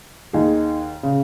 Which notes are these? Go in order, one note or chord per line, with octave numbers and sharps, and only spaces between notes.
D#2 D#3 D#4 G#4
C#3